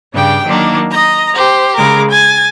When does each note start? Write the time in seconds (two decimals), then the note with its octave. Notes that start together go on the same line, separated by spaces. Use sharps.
0.15 G2 C#3 D4 G4 G5
0.46 D#3 F#3 A#3 D4
0.90 D#5 A#5
1.36 G4 C5
1.75 C#3 G#3 A#4 D6
2.11 G#5 A6